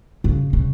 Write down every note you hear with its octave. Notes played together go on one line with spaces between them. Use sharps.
C#3
C#3